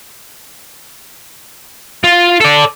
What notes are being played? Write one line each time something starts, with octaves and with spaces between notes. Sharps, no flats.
F4
A4 D5